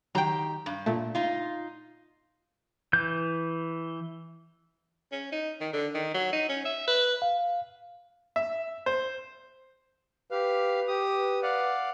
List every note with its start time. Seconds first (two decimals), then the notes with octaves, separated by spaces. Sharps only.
0.15 D#3 F#3 G4 G5 A#5
0.66 G2
0.86 A#2 A3
1.15 D#4 F4
2.93 E3 G6
5.11 C#4
5.32 D#4
5.60 D#3
5.73 D3
5.94 D#3
6.14 F#3
6.33 D#4
6.49 C#4
6.65 E5
6.87 B4
7.22 F5
8.36 E5
8.86 C5
10.31 G4 B4 F5
10.88 G4 D#6
11.15 B4
11.43 D5 F5 F#5